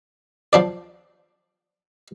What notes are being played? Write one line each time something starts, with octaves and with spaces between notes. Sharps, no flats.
F3 D4 D5